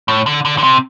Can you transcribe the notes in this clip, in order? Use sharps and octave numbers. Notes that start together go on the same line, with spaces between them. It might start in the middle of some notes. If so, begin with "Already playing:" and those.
A2
D3
D3
D3
C3